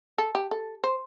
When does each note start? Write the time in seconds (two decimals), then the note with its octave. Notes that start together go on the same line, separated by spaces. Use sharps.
0.18 A4
0.35 G4
0.51 A4
0.84 C5